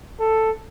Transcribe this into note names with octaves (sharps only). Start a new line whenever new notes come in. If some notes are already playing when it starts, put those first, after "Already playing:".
A4